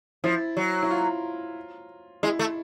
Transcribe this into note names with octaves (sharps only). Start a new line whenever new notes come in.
F3 E4
F#3
E4
F4
G#3 E4
A3